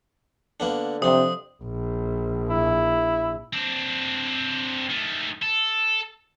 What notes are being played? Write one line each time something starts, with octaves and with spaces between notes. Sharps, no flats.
D3 A#3 B3 D4
F2 C3 C4 D#6
A#1
E4
C4 D4
D#3 A3
A4